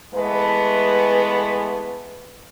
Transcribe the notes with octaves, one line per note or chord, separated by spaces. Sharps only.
E3 G#3 A3 B3 B4